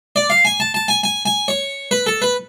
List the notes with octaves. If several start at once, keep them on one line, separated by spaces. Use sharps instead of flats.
D5
F5
G#5
A5
A5
G#5
G#5
G#5
C#5
B4
A4
B4